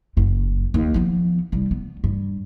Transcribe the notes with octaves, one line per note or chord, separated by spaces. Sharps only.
F#1 F#2
D#2
F3 B3
C2 G3
B3
G2